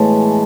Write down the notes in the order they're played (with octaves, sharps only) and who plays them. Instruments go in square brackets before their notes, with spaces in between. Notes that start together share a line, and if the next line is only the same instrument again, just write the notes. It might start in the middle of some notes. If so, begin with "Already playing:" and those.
Already playing: [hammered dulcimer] A2 E3 G#3 B3 A5